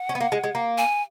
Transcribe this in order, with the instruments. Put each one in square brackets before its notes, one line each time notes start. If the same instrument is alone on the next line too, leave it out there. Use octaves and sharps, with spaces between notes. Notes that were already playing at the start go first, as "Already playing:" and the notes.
Already playing: [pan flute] F#5
[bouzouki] C#4
B3
A#3
G#3
G#3
A#3
[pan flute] G#5